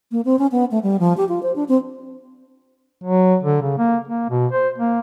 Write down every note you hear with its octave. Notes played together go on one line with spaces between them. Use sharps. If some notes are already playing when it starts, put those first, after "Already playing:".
A#3
C4
C#4
B3
A3
G3
F3
G4
F4
C5
D4
C4
F#3
D3
C#3
A#3
A#3
B2
C5
A#3